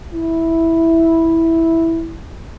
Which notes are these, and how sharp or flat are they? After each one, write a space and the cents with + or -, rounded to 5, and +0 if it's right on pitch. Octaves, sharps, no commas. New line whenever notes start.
E4 -5